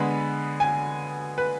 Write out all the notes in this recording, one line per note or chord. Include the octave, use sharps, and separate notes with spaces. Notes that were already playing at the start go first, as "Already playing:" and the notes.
Already playing: D3 G#3 B3 B5
G#5
B4